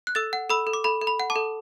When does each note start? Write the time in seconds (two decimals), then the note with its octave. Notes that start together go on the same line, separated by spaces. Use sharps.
0.07 F#6
0.15 A4 E6 A6
0.33 F#5
0.49 A4 B5 E6
0.67 A4
0.73 D6
0.84 A4 B5
1.01 A4
1.07 B5
1.20 F#5
1.30 A5 D6
1.36 A4